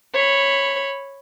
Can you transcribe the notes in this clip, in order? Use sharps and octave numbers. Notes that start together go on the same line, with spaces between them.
C#5 B5